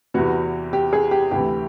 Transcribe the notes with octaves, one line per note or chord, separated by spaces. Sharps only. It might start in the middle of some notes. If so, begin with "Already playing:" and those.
E2 C3 E3 F#4
G4
G#4
G4
D2 C3 E3 G4